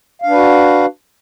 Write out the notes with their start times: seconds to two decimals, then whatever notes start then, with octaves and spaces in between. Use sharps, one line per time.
0.22 F5
0.26 D4
0.30 B4
0.34 F#4